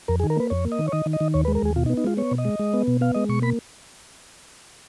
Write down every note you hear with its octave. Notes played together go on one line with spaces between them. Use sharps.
F2 A#4
G#4
D#3
A#4
A#3 B4
F2 C#5
A#3
D#5
D#3
C#5
D#3 D#5
D#3
D#5
D#3
D#2 C#5
B4
G#3
A#4
D#2 G#4
B2 F4
D#4
B3
D#4
G#3 F4
B3 C#5
B2
D#5
G#3
G#3
B3
B2
B3 F5
G#3 D#5
B2 C#6
A#3 B5